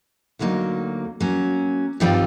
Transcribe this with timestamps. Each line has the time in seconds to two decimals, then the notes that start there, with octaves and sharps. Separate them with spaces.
0.39 D2 D3 F#3 A#3 D#4
1.21 F#3 A#3 C#4
2.00 G2 D#3 G3 C4 F4